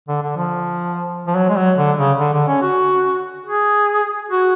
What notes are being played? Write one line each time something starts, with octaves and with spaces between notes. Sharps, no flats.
D3
D3
F3
F3
F#3
G#3
F#3
D3
C#3
D3
D3
C#4
F#4
G#4
F#4